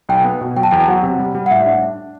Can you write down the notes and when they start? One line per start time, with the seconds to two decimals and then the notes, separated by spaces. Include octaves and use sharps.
0.09 B1 G5
0.24 B3
0.41 B2
0.56 F#3 G5
0.63 A5
0.71 E2 G5
0.88 F#3 F#5
1.03 C3
1.19 G3
1.35 G3
1.46 F#5
1.51 A2 E5
1.66 D4
1.82 D4